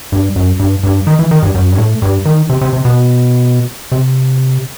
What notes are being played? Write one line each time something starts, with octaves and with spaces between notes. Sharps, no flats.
G2
F#2
G2
G2
D#3
E3
D#3
G2
F#2
G2
A2
G2
D#3
C3
C3
C3
B2
C3